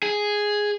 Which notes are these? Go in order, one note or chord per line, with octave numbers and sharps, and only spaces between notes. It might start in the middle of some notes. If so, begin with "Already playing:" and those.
G#4